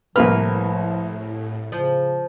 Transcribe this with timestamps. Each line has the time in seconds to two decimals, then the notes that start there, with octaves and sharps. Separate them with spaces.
0.16 C2 A2 F3 A#3 B4 F6
1.72 C#3 F3